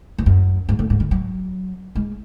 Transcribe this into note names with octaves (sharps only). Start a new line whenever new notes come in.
G#2
F#2
G#2
A2
G#2
D#3
F#3
G#3